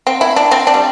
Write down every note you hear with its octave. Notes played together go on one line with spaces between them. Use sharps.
C4
E4
D4
C4
D4
G3